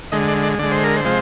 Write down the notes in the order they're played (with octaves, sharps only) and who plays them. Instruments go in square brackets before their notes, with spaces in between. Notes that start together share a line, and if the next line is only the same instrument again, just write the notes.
[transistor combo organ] D3 G#3 D#5
D5
D5
D3 G#3 D5
C5
A#4
C5
C3 F3 G#3